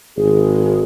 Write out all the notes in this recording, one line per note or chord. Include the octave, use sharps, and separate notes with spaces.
G#1 G#4